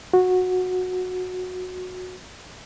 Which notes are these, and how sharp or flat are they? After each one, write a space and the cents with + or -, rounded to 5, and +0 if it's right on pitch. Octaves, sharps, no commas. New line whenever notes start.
F#4 -15